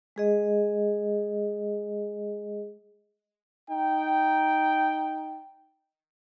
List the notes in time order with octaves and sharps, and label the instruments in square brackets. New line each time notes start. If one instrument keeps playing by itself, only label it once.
[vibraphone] G#3 G#4 D#5
[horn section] D#4 G5